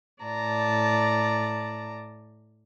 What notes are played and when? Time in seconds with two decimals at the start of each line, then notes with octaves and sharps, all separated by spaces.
0.24 A2 D5 A5 A#5